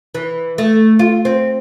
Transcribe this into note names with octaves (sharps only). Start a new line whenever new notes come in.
E3
A3
F4
C4